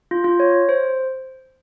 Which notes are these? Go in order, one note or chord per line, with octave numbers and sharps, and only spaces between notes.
F4
F4
C#5
C5